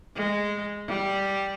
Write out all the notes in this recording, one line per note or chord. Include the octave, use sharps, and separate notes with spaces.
G#3
G3